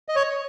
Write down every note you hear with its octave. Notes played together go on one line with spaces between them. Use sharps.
D#5
C#5